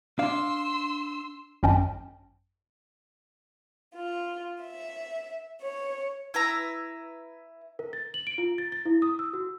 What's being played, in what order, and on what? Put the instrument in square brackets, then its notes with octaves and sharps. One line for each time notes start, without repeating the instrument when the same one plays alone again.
[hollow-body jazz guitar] D4 F5 [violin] C6 E6
[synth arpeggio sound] G#1 F#2 C#4 D#5 G5 A5
[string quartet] F4
E5
C#5
[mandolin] E4 B4 E5 A#5
[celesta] A#4
A6
F#7
D7
F4
A6
A6
E4
D#6
E6
F#4